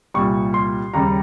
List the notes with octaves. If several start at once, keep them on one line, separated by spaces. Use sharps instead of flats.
C2 A#2 G3 C#6
C6
D#2 C#3 G3 A#5